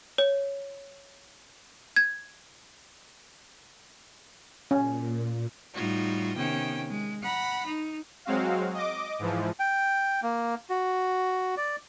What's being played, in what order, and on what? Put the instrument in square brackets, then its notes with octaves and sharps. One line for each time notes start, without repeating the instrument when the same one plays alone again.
[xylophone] C#5
G#6
[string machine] A#2 [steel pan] C#4
[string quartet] A2 G3 D#4 F4 F#4
C3 D#3 B3 C#4 G5
G#3
F#5 A#5 B5
D#4
[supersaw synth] F#3 G#3 C4 F#4 F5
D#5 D6
G#2 E3 F3
[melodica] G5
A#3
F#4
D5